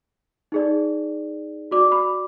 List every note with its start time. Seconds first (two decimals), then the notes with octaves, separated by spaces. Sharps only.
0.52 D#4 G#4 D5
1.71 F#4 D5 D6
1.92 B5